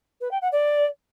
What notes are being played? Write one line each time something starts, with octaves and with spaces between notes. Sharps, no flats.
B4
G5
F#5
D5